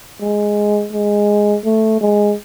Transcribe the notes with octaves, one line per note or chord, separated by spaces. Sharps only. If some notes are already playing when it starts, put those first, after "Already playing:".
G#3
G#3
A3
G#3